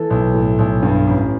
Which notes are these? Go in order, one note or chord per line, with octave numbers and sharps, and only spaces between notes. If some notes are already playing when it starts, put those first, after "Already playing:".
Already playing: E3 A4
B1
A2
B1
G2
A1